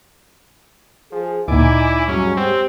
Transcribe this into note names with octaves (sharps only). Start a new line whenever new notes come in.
F3 G#4
D2 A#2 D#4 E4 D5 G#5 D6
G2 F#3 G#3 C#4
C4 G4